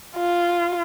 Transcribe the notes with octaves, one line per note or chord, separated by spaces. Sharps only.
F4